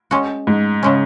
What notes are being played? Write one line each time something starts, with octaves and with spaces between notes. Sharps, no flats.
G#3 C#4 F#4
G#2
C#3 G#3 C#4